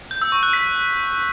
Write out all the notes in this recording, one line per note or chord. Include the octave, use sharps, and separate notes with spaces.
G6
E6
C#6
F#6
B6